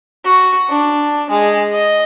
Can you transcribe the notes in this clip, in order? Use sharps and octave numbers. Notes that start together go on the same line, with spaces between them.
F#4
D4
G#3
D#5